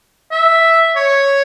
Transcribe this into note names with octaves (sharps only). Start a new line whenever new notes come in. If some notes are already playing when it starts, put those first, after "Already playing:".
E5
C#5